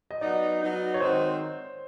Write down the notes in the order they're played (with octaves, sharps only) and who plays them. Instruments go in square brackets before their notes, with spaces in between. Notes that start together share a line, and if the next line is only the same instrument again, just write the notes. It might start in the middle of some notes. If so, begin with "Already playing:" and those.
[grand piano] D#5
[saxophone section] F#3 B3 D#4 [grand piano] D5
[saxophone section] F#3 B3 D#4
[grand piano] C#5
[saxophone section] D#3 G#3 C4 D#4 F#4 [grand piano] C5